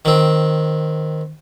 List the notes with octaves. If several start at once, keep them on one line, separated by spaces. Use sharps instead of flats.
D#3 C4